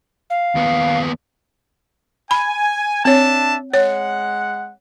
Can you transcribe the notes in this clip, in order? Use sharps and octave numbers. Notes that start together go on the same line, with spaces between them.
F5
D#2 B3
G#5 B5
C4 D4 C#5 E5 A5
G#3 C#5 F#5